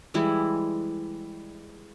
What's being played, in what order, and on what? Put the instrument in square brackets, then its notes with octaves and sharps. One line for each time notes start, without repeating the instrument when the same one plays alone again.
[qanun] E3 G3 G#3 E4